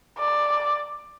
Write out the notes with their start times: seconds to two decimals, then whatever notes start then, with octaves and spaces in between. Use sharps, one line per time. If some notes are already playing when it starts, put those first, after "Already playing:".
0.19 D5